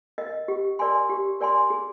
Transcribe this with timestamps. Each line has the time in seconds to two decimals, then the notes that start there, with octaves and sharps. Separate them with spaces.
0.18 A#4 D#5
0.48 G4
0.79 A#4 D5 G#5 C6
1.09 G4
1.40 A#4 D5 G#5 C6
1.70 G#4